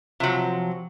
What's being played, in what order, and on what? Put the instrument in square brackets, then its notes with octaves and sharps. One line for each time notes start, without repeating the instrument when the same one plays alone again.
[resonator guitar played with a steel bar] C3 F#3 [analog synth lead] F3